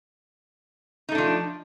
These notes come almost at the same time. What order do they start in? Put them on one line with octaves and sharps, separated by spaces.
D#4 A3 D4 F3